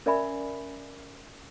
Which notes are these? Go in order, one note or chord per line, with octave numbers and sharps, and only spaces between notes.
C#4 A#4 D5 E5 G#5 B5